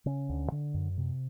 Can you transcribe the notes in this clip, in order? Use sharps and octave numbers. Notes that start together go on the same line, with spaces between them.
C#3 C#4
D2
D3
F#2
C3